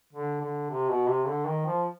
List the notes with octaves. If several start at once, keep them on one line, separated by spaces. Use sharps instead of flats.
D3
D3
C3
B2
C3
D3
D#3
F3